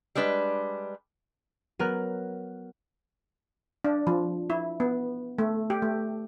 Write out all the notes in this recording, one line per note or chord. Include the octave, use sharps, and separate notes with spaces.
G3 G#3 D4 B4
F#3 B3 A#4 F6 F#6
D4
F3
E4
B3
A3
G4
A3